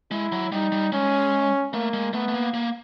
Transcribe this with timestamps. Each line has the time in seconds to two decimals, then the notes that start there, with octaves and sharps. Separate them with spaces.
0.11 G#3 E4
0.32 F#3
0.52 G3 D#4
0.72 G3
0.92 G#3 C#4
1.73 A3 A#3
1.93 G#3
2.13 A3 B3
2.28 A3
2.34 A#3
2.54 A#3